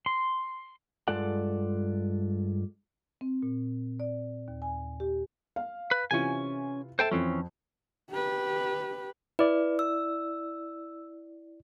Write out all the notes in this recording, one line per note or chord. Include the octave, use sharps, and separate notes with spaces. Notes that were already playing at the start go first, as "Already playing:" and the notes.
C6
G2 G#3 F4 A4 D5 F#5
C4
A#2
D5
D#2
G#5
G4
F5
B4
C3 E3 C#4 F4 G#5
A4 C5 E5 G5 A5
F2 E3 C4 C#4
G4 B4
E4 B4 D5
E6